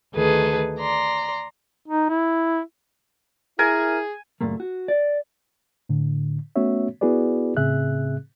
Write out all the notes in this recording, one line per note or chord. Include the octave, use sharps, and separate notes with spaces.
D2 D#3 G#4 A4 B4
D5 A#5 C6
D#4
E4
E4 G#4 A#4 G#5
C#2 F#2 A#2 A3 A#3
F#4
D5
A2 D3
A3 B3 C#4 F#4 C#5 E5
B3 E4 F#4 G#4 B4 D5
A2 C#3 C4 G#4 E5 F#6